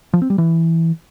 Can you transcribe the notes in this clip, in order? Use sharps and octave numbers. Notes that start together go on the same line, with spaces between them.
F3
C4
G3
E3